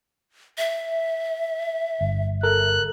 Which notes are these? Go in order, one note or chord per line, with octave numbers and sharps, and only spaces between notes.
E5
G1
A4 A#4 F#6